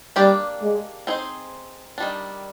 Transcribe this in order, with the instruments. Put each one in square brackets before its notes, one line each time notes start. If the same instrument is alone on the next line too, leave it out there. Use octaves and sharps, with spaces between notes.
[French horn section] G3 [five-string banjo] A#3 D4 G4 D5
[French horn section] G#3
[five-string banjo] C4 D#4 G#4 C5
D#3 G3 D4